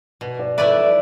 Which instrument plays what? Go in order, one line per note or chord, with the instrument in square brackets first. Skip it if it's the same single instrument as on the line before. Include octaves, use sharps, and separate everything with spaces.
[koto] B2 [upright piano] B4
[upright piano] D5
[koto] A3 E4 B4 D5 [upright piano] E5
[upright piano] E5